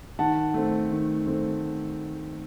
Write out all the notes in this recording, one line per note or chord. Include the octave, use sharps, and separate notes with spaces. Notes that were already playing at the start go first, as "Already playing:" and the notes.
D#3 F#5 A5
A3 C4
D#3
A3 C4